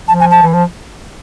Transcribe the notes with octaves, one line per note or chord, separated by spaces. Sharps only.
F3 A5
G#5
A5
E3
F3